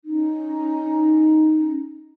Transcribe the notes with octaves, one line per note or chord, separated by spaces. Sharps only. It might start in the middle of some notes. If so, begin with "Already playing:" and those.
C#4 D#4